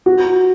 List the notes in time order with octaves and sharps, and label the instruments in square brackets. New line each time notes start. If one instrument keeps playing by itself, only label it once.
[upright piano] F#4